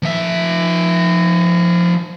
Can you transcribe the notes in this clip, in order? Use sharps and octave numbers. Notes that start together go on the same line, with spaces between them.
F3 E5